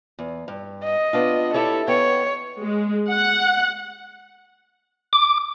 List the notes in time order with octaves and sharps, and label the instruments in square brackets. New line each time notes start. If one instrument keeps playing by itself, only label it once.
[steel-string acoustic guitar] E2
G2
[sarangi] D#5
[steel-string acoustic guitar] B3 D4 F4
[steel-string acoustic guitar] E4 G4 C#5 [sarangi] A4
[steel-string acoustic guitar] B3 G5 [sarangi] C#5
[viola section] G#3
F#5
[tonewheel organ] D6